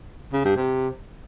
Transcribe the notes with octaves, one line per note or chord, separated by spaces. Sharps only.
C#3
G2
C3